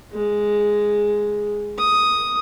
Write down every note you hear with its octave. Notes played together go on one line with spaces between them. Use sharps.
G#3
D#6